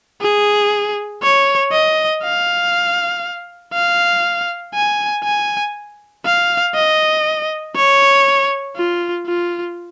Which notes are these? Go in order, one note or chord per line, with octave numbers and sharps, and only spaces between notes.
G#4
C#5
D#5
F5
F5
G#5
G#5
F5
D#5
C#5
F4
F4